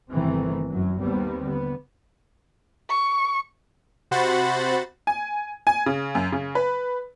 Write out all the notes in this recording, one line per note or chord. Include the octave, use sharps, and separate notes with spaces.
G1 C3 D#3 E3 A3 C4
F#2 F#3
D#2 D#3 G3 B3 C4
D3 B3
C#6
C3 F#4 C5 F#5 B5 A6
G#5
G#5
C#3
F#2
C#3
B4